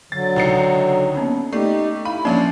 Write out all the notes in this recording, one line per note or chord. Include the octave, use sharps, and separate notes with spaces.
D3 F#3 A6
C#2 D#4 C#7
A#3 B3 C#4
A3 D#4 G4 D5
E4 F5 B5
A1 F3 A#3 C#4 D4